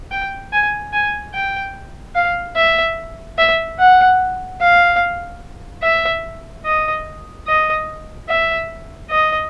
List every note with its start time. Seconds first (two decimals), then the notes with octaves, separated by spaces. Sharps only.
0.11 G5
0.53 G#5
0.93 G#5
1.34 G5
2.15 F5
2.56 E5
3.38 E5
3.79 F#5
4.61 F5
5.83 E5
6.65 D#5
7.47 D#5
8.29 E5
9.10 D#5